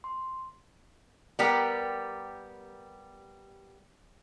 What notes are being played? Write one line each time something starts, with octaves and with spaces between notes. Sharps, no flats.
C6
G3 B3 G4 A#4